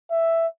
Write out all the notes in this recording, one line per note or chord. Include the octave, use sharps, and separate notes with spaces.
E5